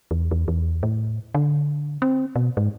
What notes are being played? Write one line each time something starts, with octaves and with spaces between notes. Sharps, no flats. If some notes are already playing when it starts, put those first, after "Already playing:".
E2
E2
E2
A2
D3
C4
B2
G#2